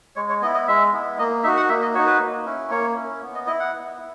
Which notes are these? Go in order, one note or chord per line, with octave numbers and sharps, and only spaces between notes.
G#3 C#5
C#5
B3 E4 D#5
D#5
G#3 E5
B3 E4
A#3 D#5
D#4 F#4 E5
F#5
A#3 E5
D#5
D#4 F#4 C#5
B4
A#3
C#4 E4
A#3 C#5
C#4 E4
B3
D#5
E4 D#5
F#5
B3
E4